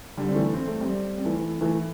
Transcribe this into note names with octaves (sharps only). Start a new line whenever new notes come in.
D3 G3
C4
E3 A3
C4
A3
G3 C4
C4
E3 A3
E3 A3